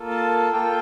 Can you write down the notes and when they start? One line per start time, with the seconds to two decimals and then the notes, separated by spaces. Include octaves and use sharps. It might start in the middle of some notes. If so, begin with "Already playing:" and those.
Already playing: A#3 F4 A4
0.10 A5
0.53 A#3 F4 A4 G5